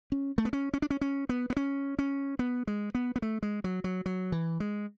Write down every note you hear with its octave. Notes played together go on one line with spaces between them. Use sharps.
C#4
A3
B3
C#4
C#4
D4
C#4
C#4
B3
B3
C#4
C#4
B3
G#3
B3
B3
A3
G#3
F#3
F#3
F#3
E3
G#3